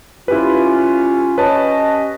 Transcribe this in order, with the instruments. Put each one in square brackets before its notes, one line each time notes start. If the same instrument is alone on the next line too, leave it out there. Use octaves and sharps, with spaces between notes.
[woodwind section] C#4 F4 [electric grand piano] E4 G4 B4
[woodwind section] C#4 G4 D#5 [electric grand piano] B4 C#5 A5